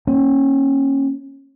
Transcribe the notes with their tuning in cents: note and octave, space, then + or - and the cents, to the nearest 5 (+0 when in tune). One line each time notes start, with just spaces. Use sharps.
A#3 +0 C#4 -20